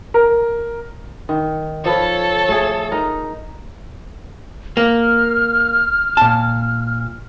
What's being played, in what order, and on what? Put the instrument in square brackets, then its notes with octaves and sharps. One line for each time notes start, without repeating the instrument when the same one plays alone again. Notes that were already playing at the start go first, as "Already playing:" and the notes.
[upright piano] A#4
[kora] D#3
[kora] F3 B4 [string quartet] A4 C#5
[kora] A3 G#4
D#4 A#4
[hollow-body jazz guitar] A#3 [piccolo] F6
[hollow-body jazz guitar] A#2 A5